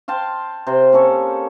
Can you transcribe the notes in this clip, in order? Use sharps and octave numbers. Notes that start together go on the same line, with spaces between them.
F5 G5 A5 C6
C3 C5 G5
A#3 C#4 A4 C#5